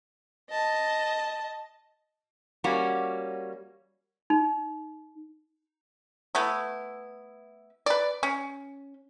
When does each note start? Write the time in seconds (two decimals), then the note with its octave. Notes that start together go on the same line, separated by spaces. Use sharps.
0.50 D#5 A5
2.64 G3 A#3 C#4 F#4
4.30 D#4
6.35 A3 B3 E4
7.86 B4 D5
8.23 C#4